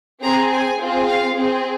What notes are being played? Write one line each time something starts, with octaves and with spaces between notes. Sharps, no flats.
C4 G#4 A#5
G#5
C4 F4 G#4
F5
C4 G#4